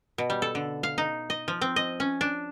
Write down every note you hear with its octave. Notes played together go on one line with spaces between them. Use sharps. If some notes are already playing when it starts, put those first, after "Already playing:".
B2
G3
A4
D3
F5
D#4
D#5
F3
C4
D#5
C#4
D4